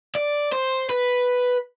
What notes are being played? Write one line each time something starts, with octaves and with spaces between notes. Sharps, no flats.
D5
C5
B4